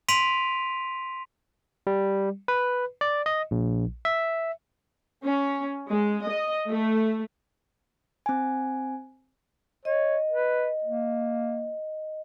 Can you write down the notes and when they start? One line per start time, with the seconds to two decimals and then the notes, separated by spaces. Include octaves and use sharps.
0.09 C6 B6 D7 D#7 F7
1.87 G3
2.48 B4
3.01 D5
3.26 D#5
3.51 A#1
4.05 E5
5.22 C#4
5.89 G#3
6.25 D#5
6.70 A3
8.26 C4 G#5
9.85 C#5 D#5
10.32 B4
10.84 A#3